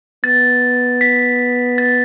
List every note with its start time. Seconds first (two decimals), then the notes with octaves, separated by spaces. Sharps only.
0.24 B3 A6
1.01 B6
1.78 A6